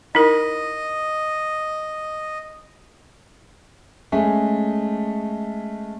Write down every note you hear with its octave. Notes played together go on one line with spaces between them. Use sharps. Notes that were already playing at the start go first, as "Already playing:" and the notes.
D#4 E4 A#4 D#5
G#3 A3 C#4 G#5